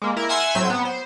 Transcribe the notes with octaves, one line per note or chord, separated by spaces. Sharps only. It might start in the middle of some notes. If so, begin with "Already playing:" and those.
G#3 A#3
E4 A#4
E5 F#5 G#5 C6 E6
A2 F#3 C4 E6 G6
B3
C5